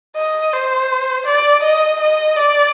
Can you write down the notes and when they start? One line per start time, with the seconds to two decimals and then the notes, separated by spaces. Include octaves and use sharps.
0.16 D#5
0.53 C5
1.26 D5
1.63 D#5
2.00 D#5
2.36 D5